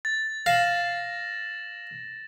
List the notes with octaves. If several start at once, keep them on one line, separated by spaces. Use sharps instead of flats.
A6
F5 A#6 E7 F#7